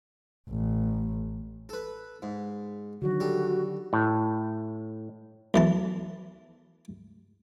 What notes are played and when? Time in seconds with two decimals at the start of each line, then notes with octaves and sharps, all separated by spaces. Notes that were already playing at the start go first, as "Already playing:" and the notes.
0.50 A1
1.69 A4 B4
2.22 G#2
3.02 D3 D#3 F#3 F#4
3.20 G3 A4
3.93 A2
5.54 B1 E3 A5